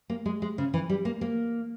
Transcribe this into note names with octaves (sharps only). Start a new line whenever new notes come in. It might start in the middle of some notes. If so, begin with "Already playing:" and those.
A#3
G#3
G#3
C#3
E3
G3
A#3
A#3